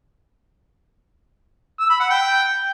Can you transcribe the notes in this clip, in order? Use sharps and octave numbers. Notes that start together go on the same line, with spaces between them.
E6
B5
F#5
G5